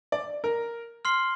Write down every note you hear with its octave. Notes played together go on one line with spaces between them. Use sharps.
D5
A#4
C6 F6 C7 G7